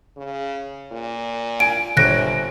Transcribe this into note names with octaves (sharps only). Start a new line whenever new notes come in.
C#3
A#2
G#5 D7
G1 C3 C#5 F#6 A#6 D7